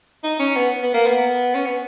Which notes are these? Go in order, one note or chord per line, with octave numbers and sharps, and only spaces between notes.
D#4
C#4
B3
B3
A#3
B3
C#4
B3